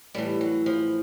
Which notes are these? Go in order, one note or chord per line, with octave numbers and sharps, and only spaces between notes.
A2 E3 G3
F#3
F3